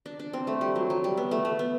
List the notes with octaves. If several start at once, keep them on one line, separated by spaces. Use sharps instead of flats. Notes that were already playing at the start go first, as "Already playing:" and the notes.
D4
D4
C4
A3
G3
F#3
F#3
G3
B3
A3
A3
B3